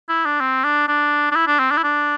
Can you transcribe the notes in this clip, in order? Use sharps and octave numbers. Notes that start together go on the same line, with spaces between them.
E4
D4
C4
D4
D4
D4
E4
D4
C4
D4
E4
D4